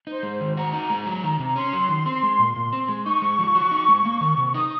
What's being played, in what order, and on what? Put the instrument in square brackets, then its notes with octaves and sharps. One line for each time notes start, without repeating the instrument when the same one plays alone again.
[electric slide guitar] D#4 [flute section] C5
[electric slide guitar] G#3
D#3
[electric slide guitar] F#4 [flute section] A#5
[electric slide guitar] D#4
G#3
F#3
D#3
[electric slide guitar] C3 [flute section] A#5
[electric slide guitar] C#4 [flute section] C6
[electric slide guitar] F#3
D#3
C4
G#3
A#2
A#2
C4
G#3
[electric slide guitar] D#4 [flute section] C#6
[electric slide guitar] G#3
F3
F#4
D#4
G#3
A#3
D#3
C3
[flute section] C#6
[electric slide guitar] D#4 [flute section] D#6